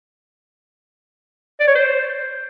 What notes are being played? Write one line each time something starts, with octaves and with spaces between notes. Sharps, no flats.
D5
C#5
C5